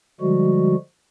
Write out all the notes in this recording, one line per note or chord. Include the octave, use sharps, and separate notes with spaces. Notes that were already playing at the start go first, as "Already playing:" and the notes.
D3 F3 G3 G#3 F#4